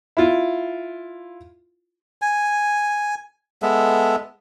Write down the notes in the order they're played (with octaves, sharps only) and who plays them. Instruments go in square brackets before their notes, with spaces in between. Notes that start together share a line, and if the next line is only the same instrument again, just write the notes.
[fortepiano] E4 F4
[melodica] G#5
G#3 B3 A4 E5